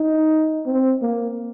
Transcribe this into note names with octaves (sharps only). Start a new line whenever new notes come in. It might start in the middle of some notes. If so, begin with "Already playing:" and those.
Already playing: D#4
C4
A#3